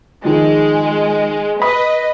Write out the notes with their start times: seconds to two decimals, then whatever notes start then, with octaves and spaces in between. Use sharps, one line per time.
0.25 D#3 F3 G#3
1.62 B4 D#5 B5